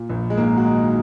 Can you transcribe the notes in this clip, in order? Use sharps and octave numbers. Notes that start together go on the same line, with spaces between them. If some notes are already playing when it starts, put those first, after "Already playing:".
Already playing: A#2
A#1
G#3
G#2 A#3
F#4
D#3 D#4